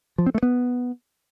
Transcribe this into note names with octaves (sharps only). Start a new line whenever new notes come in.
F3
C4
A3
B3